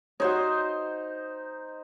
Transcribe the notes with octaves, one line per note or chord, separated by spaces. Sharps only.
D#4 F#4 C5 C#5